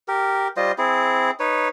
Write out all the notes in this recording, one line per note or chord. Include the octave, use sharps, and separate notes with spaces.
G4 A#4
G3 F4 C5 D#5
C4 E4 G#4
D#4 B4 C#5